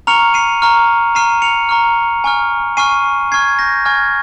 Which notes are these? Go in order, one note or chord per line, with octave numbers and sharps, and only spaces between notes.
A#5 C#6 F6 C#7 F7
C7 D#7
A#5 C#6 F6
A#5 C#6 F6 C7 D#7
C#7 F7
A#5 C#6 F6
G#5 C#6 F6
G#5 C#6 F6 C7 D#7
G#5 C#6 F6 G#6 C7
G6 A#6
G#5 C#6 F6 G#6